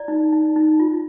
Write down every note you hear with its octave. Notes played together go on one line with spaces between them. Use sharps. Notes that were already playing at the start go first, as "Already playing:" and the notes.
Already playing: E4 D5
D#4
D#4
D#4
F4